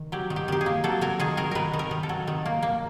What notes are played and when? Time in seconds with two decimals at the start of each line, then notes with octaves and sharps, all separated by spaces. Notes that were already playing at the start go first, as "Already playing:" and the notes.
Already playing: D#3
0.12 F#3 G4
0.30 D#3
0.36 G4
0.48 D#3 G4
0.61 G#4
0.66 A#3
0.84 F#3 A4
1.01 F#3 A#4
1.20 D#3 G#4
1.37 D#3 A#4
1.51 D#3 A#4 B4
1.73 D#3
1.79 A#4
1.91 D#3
2.03 A4
2.09 F#3
2.27 D#3
2.46 A#3
2.62 A#3